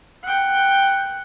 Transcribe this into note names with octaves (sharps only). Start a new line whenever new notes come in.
F#5 G5